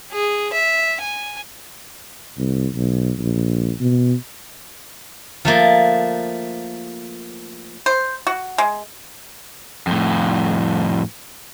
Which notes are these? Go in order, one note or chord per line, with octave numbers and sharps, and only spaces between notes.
G#4
E5
G#5
C2
B1
A#1
B2
F3 A3 A#3
C5
F#4
G#3
F2 A2